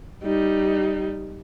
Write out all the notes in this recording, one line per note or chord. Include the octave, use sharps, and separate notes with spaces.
G3 D#4